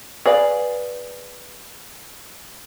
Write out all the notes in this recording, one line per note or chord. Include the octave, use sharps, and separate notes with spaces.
G#4 B4 D5 F5